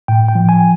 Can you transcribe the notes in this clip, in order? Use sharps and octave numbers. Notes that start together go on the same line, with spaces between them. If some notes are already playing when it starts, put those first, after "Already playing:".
A2 G5
G5
F3
G#5